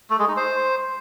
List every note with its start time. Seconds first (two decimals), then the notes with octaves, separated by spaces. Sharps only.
0.10 A3
0.19 G#3
0.28 D#4
0.37 C5